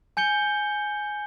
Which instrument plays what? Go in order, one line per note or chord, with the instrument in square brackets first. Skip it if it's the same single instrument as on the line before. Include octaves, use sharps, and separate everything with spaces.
[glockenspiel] G#5 G6 C#7 G7